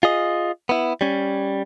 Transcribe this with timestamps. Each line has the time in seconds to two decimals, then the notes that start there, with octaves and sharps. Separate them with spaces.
0.03 F4 G#4 D#5
0.69 B3 E4
1.01 G3 C#4